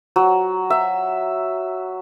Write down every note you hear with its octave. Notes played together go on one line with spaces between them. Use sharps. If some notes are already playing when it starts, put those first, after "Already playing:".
F#3
E5